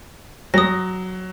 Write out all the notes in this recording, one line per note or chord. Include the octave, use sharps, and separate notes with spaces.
F#3 D#6 A#6